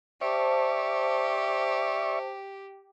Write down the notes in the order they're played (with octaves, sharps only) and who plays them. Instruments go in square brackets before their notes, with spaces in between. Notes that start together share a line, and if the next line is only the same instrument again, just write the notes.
[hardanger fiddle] G4 [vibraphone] C5 A5 [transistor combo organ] D5 E5 C#6